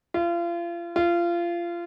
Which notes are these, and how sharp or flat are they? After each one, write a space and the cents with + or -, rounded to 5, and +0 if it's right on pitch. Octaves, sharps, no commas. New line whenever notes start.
F4 -35
F4 -25